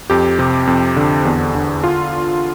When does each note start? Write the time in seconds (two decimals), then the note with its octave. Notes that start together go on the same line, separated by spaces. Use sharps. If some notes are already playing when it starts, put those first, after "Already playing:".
0.10 F2 G4
0.39 C3
0.67 F2
0.97 D3
1.25 E2
1.55 D3
1.84 F4